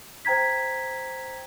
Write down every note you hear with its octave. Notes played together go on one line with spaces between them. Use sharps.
C5 G5 A#5 G#6 B6